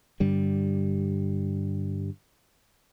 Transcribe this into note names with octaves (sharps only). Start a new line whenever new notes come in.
G2 D3 G3